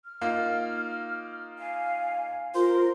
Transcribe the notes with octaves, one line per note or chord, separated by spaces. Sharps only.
F6
A#3 D#4 F4
F5 G#5
F4 A#4 C5